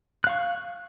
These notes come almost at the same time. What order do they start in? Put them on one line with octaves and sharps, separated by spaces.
F#6 F5 C#6